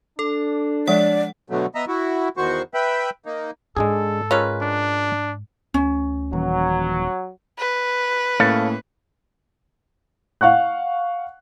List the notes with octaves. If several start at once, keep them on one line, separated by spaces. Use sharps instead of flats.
D4 A4
F3 G#3 D5 F#5
B2 D3 F#3 A3
B3 D#5 E5 A#5
E4 F#4
E2 D#3 F#4 C5 C#6
B4 E5 G5 B5
A#3 D#4
G#2 G#3 D4 G#4 A4
G#3 C#4 F4 A#4 B4
D4
D2 C#4
D#1 E3 F#3
B4
A2 A#3 C#4 A4 C#5 F5
F5 F#5 C#6 F#6